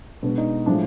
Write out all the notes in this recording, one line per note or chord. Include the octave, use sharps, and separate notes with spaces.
B2 G#3 B3 D4
D#4
A2 F3 G#3 D4